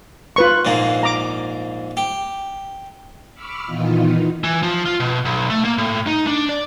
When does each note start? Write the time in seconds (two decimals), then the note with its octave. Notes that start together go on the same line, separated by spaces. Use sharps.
0.36 F4 B4 C#6
0.65 A#1 G#2 A#3
1.03 A#5 D6
1.97 G4
3.34 B5 C#6 D6 E6 F6
3.66 A#2 D#3 E3 B3 D#4 F4
4.44 E3
4.63 F3
4.86 F4
5.00 B2
5.25 B1
5.50 A3
5.65 A#3
5.78 A2
6.07 D#4
6.27 D4
6.49 D5